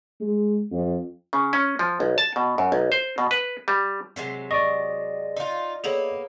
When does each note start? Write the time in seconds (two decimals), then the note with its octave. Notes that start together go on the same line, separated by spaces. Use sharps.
0.21 G#3
0.72 F2
1.33 C#3
1.53 C#4
1.79 F3
2.00 B1
2.18 A5
2.36 B2
2.58 F#2
2.72 B1
2.92 C5
3.18 B2
3.31 B4
3.68 G3
4.16 C3 F#3 G#3
4.51 D5 D#5 C#6
5.37 D#4 F4
5.84 A#3 B3 G#4 A4 C#5